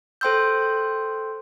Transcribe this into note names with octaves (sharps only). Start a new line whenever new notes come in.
A4 C5 G5 C6 E6 G6